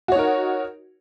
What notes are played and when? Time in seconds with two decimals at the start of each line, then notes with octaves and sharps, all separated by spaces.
0.08 F#4
0.12 C#5
0.15 D#4
0.19 A#4